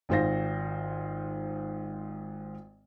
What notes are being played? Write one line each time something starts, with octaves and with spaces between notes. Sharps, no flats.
G#1 G#2 F4 C5 F5 A#6